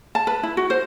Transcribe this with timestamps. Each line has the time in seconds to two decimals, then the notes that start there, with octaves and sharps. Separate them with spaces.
0.15 A5
0.27 B4
0.43 E4
0.57 F#4
0.70 C5